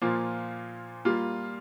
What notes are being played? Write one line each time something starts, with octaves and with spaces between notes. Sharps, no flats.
A#2 F3 A#3 F4
G3 A#3 F4